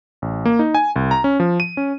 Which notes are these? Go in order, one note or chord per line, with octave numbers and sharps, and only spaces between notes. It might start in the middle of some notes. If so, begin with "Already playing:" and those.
A1
A#3
D#4
G#5
C2
A#5
C#4
F3
D#7
C#4